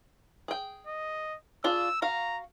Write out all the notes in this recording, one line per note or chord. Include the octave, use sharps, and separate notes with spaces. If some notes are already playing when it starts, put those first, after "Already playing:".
G#4 G5
D#5
D4 F4 G#4 E6
F#4 F5 A#5